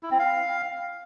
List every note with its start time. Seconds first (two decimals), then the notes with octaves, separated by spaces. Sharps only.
0.03 E4
0.11 C4
0.19 F5